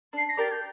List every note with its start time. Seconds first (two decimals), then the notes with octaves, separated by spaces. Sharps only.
0.13 D4 C7
0.29 A#6
0.37 G4 A#4 D5 A6
0.52 G6